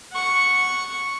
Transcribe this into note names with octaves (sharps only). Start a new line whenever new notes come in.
F#5 C#6